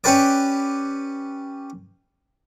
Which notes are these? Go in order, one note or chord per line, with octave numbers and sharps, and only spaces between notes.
C#4 G4 B4 D5